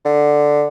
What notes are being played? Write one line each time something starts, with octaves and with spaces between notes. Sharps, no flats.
D3